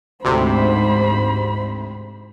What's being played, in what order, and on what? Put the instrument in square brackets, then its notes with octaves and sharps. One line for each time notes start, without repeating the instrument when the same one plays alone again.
[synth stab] D2 C3 [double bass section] G#2 [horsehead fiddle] C5 B5